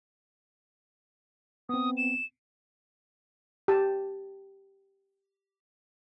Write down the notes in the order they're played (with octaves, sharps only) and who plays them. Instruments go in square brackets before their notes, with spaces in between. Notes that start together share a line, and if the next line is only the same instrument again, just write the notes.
[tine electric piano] B3 C4 [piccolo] D#6
[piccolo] E7
[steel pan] G4 A5